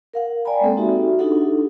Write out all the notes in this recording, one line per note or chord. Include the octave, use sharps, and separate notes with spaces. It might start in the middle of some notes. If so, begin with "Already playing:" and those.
A#4 F5 F#5
D5 G5 G#5 A#5 B5
G#3 A#3 C4 A4
D#4 F#4 G4 E5 B5
D4 D#4 F4 G4 A4 F#5